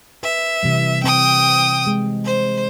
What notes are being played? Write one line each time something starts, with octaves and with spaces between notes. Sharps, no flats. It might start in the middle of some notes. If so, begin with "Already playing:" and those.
B4 E5
C3 E3 G3
C4 G5 D#6
G#3
C5